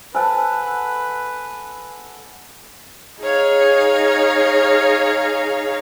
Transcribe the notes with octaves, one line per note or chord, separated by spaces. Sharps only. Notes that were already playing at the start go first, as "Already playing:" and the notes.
A4 B4 C5 F#5 G#5 A5
D#4 G#4 C#5 F5